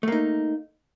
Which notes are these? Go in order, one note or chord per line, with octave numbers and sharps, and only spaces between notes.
A3 A#3 D#4